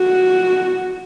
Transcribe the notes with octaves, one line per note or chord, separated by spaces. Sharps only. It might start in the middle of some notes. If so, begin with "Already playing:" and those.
Already playing: F#4